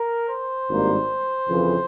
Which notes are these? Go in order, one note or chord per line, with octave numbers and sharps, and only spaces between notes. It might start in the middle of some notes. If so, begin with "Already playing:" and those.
Already playing: A#4
C5
G#1 G2 G3 A#3
F2 C#3 E3